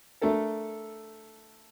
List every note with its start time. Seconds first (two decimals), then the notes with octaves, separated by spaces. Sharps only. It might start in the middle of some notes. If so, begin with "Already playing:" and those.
0.21 A3 D4 A4 A#4